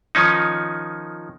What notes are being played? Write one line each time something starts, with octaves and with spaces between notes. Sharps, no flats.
D#3 F3 C#4 D#4